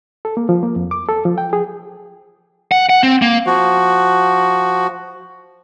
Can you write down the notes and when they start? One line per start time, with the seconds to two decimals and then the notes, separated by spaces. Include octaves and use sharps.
0.25 A4
0.37 A#3
0.49 F3
0.63 A#3
0.76 F2
0.91 D6
1.09 A4
1.25 F3
1.38 G5
1.53 G#4
2.72 F#5
2.89 F#5
3.03 C4
3.22 A#3
3.46 F3 F#4